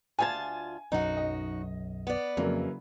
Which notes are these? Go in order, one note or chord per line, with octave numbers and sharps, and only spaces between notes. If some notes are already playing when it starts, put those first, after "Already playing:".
D2 F4 G#5 A5 G#6
B1 F#2 D#4 F#4
D#5
B3 D5
F2 C#3 E3 F#3 A#3